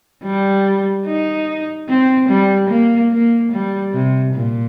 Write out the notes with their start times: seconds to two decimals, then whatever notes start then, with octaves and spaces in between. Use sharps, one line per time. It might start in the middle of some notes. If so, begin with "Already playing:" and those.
0.24 G3
1.06 D#4
1.88 C4
2.29 G3
2.70 A#3
3.12 A#3
3.52 G3
3.93 C3
4.34 A#2